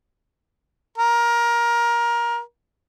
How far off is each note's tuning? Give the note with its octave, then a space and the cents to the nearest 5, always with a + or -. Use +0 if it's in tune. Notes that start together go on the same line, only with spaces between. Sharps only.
A#4 +20